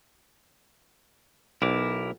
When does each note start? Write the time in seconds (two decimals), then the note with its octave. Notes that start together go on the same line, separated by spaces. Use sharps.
1.62 B1 E4 A#4 D6